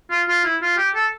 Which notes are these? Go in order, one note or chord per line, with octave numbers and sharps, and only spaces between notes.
F4
F4
E4
F4
G4
A4